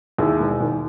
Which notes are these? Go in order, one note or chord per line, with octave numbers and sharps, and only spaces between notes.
D#2 E4 G#4
E1
D#2